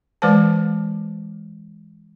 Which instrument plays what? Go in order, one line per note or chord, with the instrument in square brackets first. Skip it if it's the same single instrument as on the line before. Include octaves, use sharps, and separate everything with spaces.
[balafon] E3 G#3 B4 C5 A5